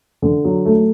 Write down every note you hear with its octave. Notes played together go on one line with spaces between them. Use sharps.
D3
F#3
A3